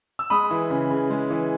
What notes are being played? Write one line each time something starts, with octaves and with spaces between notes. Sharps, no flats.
E6
G#3 B5 D#6
E3
C#3
C#3
G#3
E3